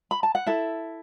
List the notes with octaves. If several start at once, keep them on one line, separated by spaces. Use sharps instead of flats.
B5
A5
F#5
E4 A4 E5